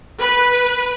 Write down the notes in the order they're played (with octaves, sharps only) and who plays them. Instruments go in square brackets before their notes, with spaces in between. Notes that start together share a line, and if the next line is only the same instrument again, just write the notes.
[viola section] B4